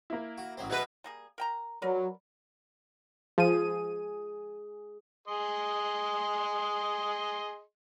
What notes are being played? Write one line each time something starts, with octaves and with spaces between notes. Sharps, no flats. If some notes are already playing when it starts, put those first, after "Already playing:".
A#3 E4
F#4
A1 F#3 C4
B2 F#3 G#4 B4 E5
G3 A#3 G#4
A#4 G5 A#5
F#3 A#4 B4 D5
F3 G#4 D#7
G#4 D#5 C6